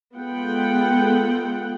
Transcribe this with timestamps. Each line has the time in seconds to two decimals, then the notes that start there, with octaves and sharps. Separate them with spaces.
0.16 G#3 B3 F4 A4 F#5 G5